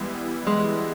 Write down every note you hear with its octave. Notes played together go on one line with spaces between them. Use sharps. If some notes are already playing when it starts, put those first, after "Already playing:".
Already playing: E3 G3 G#3 B3 E4
G#3